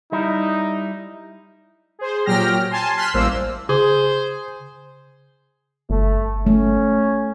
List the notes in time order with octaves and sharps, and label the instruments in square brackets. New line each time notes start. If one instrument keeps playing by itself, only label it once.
[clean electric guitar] G3 E4 [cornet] D#4
[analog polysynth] G#4 C5
A#2 F#3 G4 G5 F6 A#6
G#5 A5 C6
C6 F6 F#6 B6
A1 G3 A#3 C5 E6
[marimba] C#3 [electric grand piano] G#4 [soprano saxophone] C5
[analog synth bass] G1 [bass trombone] A3
[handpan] A3 [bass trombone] C#4